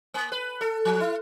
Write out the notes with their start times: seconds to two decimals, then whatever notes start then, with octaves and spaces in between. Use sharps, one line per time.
0.14 A#3
0.32 B4
0.61 A4
0.85 F3
1.00 E4